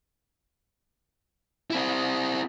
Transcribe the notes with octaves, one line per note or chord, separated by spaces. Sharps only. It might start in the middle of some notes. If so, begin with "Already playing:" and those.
C4 E4